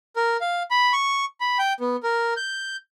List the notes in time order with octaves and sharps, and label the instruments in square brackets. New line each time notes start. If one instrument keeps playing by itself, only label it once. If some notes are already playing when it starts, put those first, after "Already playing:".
[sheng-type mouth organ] A#4
F5
B5
C#6
B5
G5
B3
A#4
G6